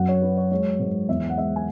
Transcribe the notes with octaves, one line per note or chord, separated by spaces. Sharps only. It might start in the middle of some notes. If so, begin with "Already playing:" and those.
Already playing: F#2 F#5
C#5
F#3 B4
C#5
G#3 C#5
G#2
E2 E5
F#5
G#3 E5
G#5